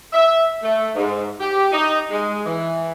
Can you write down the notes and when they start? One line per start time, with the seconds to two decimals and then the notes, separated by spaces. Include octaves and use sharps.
0.13 E5
0.63 A3
0.96 G#2
1.40 G4
1.72 D#4
2.11 G#3
2.46 E3